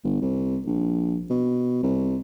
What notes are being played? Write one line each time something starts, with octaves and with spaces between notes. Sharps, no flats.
G1
C2
A#1
B2
C2